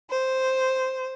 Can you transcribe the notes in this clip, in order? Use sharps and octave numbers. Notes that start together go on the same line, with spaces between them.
C5